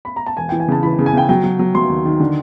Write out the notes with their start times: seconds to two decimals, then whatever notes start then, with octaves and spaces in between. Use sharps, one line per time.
0.05 B5
0.16 A#5
0.26 A5
0.37 E1 G#5
0.49 E3 G5
0.60 G#5
0.68 C#3 A5
0.83 E3 B5
0.99 C#3
1.06 G#5
1.13 C#3 G5
1.29 F#3 G5
1.43 F#3
1.59 F#3
1.75 F#3 C6
1.89 D#2
2.05 D#3
2.20 D3